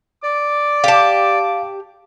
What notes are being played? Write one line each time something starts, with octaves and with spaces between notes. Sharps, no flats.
D5 D6
G4 F5 A5